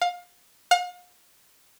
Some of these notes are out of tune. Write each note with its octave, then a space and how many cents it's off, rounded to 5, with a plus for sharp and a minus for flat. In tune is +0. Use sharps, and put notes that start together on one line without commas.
F5 +25
F5 +40